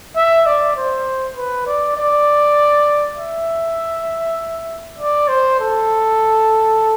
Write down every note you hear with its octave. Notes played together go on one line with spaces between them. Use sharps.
E5
D5
C5
B4
D5
D5
E5
D5
C5
A4